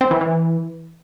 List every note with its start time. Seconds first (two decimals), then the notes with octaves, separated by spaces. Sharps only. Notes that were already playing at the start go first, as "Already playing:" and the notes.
0.01 C4
0.11 E3
0.21 E3